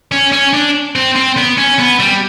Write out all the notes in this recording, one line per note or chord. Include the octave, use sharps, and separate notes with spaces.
C#4
C#4
D4
C4
C4
B3
C#4
B3
G3